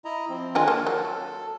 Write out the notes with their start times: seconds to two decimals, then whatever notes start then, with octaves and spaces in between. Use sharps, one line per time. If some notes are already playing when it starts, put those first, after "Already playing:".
0.05 E4 D#5 A#5
0.29 F3 C4
0.55 D3 D#3 G#3 D4 F4 G#5
0.68 A#3 A4
0.87 F#3